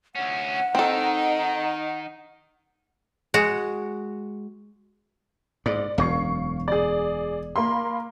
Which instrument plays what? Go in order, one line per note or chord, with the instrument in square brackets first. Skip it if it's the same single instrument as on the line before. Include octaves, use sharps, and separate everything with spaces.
[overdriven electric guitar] D2 C#4 [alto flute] F#5
[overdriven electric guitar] D#3 [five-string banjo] C4 A4 [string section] D#4
[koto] G#3 F#4
[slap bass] G#2 [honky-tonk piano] D5
[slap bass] E1 F#2 [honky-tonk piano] F5 C#6 C7
[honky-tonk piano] G#4 D5
A#3 B5 C6